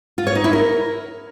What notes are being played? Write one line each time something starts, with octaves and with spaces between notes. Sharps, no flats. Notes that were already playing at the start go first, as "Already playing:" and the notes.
F4
C#5
D#4
E4
A#4